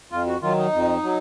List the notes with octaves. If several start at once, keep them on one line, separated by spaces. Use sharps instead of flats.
F2 F4
F#4
D#3 F#3 F4
D#4
F2
F#3